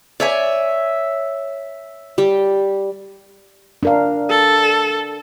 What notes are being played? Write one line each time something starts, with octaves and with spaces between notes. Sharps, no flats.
C#5 D5 E5 G#5
G3 G4
D4 A#4 F5
A4